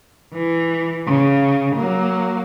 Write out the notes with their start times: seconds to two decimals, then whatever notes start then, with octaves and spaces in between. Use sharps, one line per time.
0.34 E3
1.07 C#3
1.76 F#3 A#3